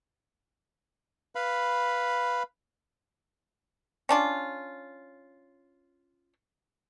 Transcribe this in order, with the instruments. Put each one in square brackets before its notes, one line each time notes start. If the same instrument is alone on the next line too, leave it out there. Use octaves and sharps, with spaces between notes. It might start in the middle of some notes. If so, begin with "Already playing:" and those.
[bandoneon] B4 F5 B5
[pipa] C#4 D4 F4